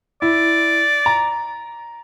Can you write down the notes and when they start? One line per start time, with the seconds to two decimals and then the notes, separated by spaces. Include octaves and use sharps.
0.22 E4 D5
1.06 A#5